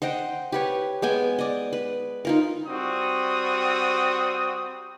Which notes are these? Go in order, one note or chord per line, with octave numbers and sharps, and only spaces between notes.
C5 D#5 F#5 G5
G4 B4 C#5
G#3 B3 G5 G#5
D5 D#5
B4
D#4 F4 A#4
G3 C4 F#4 D#6